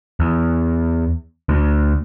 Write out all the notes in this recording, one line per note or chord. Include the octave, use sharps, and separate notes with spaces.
E2
D2